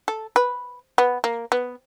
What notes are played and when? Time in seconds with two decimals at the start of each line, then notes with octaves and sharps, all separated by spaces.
0.08 A4
0.36 B4
0.98 B3
1.24 A#3
1.52 B3